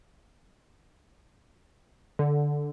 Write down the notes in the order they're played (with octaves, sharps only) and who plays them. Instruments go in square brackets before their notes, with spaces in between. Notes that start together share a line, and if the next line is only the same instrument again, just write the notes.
[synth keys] D3